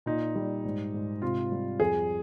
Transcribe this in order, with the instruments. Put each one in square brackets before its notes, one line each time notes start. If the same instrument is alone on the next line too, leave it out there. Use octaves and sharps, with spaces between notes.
[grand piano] A#2 D#4
G3
G#2
G#2
C3 F4
G3
F2 G#4